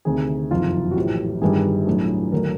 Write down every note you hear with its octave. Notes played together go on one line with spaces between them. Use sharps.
D2 C3 D#3 G#4
F#1 F2 C3 D#3 F4
F#4
A#1 A2 E3 G4
G1 G2 D#3 G3 G#4
B1 A2 F#3 A3 D4
D#2 D3 F#3 A3 A#4